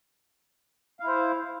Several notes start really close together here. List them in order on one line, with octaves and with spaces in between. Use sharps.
F5 E4 C5